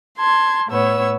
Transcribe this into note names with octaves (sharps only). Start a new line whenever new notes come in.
A5 C6 G#6
A2 B3 C#5 E6